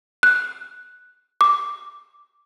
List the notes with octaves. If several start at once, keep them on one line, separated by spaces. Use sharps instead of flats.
F#6
D6